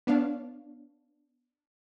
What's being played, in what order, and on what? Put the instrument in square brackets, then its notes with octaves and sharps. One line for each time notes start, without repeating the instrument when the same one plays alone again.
[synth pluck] B3 D4 C#5 F5